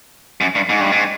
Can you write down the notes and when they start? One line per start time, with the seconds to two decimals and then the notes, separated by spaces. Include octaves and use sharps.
0.41 F#2
0.55 G2
0.69 G#2
0.80 G2
0.91 G#2